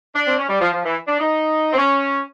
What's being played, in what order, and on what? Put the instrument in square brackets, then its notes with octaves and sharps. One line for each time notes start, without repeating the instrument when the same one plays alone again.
[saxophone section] D4
C4
C#4
G3
F3
F3
E3
D4
D#4
C4
C#4